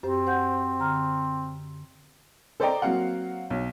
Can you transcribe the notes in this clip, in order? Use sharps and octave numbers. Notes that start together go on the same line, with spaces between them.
F#2 C4 G4 C5
C5 F#5 G6
D3 A#5 F6
A4 C5 D5 D#5 G5 A#5
F#3 A#3 C4 F5 F#5
B1